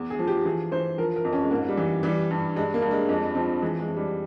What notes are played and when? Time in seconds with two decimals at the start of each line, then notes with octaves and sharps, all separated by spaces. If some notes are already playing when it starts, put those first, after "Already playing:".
Already playing: E2
0.10 G#4
0.19 F3
0.27 G4
0.45 E3 G#4
0.71 E3 C5
0.98 F3 A#4
1.16 A#4
1.25 F2
1.33 C#4
1.42 G#3
1.51 G#2 A#3
1.68 G3
1.77 E3
2.03 E3 G3
2.31 G2
2.56 G2 G#3
2.74 A#3
2.82 G2
2.91 G#3
3.09 F2 G#3
3.35 F3 C4
3.62 E3 G#3
3.79 G#3
3.88 F2
3.96 G3